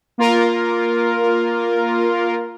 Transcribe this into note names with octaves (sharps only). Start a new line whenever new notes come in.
A#3 F4 A#4